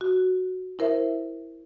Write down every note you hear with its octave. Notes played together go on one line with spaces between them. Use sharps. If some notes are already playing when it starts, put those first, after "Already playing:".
F#4
E4 A#4 C5 E5